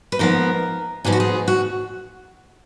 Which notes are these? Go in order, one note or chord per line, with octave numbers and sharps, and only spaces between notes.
B4
G#2 F3 B3 A#4
G#2 F3 B3 G#4
F#4
G#4
F#4